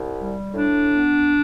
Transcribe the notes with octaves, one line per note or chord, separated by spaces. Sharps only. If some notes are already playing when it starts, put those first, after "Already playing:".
Already playing: C2
G3
A2 D4
B3